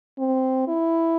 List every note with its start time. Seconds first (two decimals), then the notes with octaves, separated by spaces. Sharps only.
0.19 C4
0.68 E4